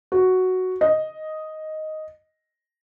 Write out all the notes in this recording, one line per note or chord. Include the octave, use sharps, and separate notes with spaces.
F#4
D#5